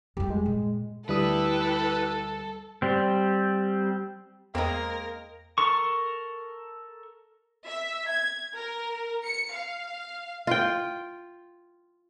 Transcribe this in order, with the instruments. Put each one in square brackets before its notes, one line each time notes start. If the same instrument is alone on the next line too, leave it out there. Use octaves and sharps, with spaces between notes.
[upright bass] F2 G3 [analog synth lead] G4
[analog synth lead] G#3
[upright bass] A#2
[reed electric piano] D2 G3 D#6 [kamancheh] E4 G4 [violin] A4 [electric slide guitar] B4
[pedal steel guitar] G3 C4
[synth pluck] E2 [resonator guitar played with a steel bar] G#3 A#3 [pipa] C4 D#4 [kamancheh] A#4
[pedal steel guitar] A4 A#4 C#6
[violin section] E5
G#6
A#4
C#7
F5
[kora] F4 G5